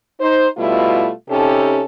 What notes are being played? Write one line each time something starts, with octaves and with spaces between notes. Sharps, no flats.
D#4 C5
B2 G3 A3 E4 F4
C3 C#4 D#4 G4 A4